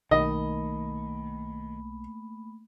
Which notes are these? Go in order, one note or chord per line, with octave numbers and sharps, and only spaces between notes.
B1 D#3 A3 A#3 D#5 B5